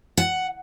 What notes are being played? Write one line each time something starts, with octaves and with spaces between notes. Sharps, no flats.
F#5